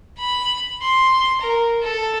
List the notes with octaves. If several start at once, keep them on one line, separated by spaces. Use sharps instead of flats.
B5
C6
A#4
A4